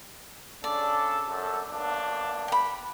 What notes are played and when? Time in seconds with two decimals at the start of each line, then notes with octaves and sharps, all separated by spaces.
0.64 C#3 D4 A4 D5
1.27 F#2 A4
1.71 B1 A#3 D4
2.48 G5 B5